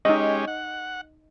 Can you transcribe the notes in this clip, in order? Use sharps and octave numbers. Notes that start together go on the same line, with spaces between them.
G#3 C#4 D#4 G4 D#5
F#5